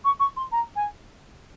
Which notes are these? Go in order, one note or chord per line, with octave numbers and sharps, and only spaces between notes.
C#6
C#6
C6
A#5
G#5